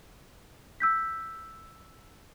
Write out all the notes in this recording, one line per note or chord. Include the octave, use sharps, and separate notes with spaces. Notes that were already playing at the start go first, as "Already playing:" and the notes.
E6 G6 B6